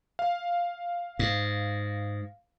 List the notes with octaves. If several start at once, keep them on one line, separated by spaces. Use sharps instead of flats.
F5
G#2